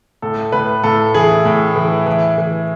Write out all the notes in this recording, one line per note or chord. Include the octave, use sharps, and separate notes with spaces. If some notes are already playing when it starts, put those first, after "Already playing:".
A2 A4
A2 B4
A2 A4
E3 G#4
A2
E3
E3
E3